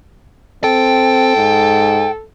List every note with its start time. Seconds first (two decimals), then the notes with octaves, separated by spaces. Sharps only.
0.64 C4 A4 G5
1.37 G#2